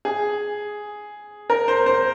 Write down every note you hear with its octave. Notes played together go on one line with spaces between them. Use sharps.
G#4
A#4
C5
C5